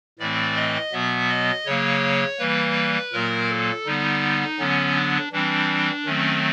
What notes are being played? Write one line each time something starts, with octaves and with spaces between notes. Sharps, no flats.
A2 E3 A3 C4 D5
D#5
B2 F#3 B3 E5
D#5
C#3 F#3 A#3 C#5
E3 G3 A#3 B4
A#2 F#3 A#3 A#4
A4
D3 G3 B3 D#4
D3 F#3 B3 C#4
D4
E3 G3 C4 D4
D#3 F#3 A3 C4 C#4